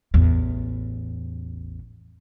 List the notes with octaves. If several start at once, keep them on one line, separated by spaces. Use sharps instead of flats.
A1 E2